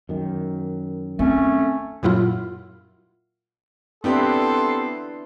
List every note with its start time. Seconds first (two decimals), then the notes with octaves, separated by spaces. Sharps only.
0.09 F#2 D#3
1.19 A3 C4 C#4
2.03 F#2 A#2 F#3 E4 F4
4.04 B3 C4 D4 E4 G4 A4 B4 C6